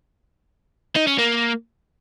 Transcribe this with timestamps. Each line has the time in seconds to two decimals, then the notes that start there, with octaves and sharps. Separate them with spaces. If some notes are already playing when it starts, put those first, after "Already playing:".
0.96 D#4
1.08 C#4
1.19 A#3